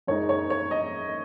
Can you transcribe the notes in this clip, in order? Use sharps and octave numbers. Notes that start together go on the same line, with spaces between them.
F#2 C#3 G#3 D#4 C#5
C#5
C#5
D#5